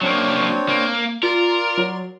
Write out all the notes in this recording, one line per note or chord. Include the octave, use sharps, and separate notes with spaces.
F#3 A#3 C4 D4 C#5
A#3
F4 A#4 D5 C6
F#3